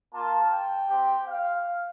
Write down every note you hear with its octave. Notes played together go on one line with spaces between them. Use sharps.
A#3 F4 A5
G5
C4 G4
F5